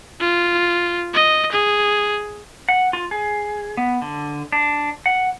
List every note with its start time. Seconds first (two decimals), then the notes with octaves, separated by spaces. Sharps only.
0.21 F4
1.14 D#5
1.52 G#4
2.69 F#5
2.93 F4
3.11 G#4
3.77 B3
4.02 D3
4.52 D4
5.06 F#5